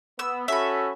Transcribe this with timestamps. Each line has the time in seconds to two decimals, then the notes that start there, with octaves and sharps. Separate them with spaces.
0.19 B3 E6
0.48 C#4 F#4 A4 E5 B5